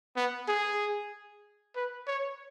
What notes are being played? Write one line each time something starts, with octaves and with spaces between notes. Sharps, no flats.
B3
G#4
B4
C#5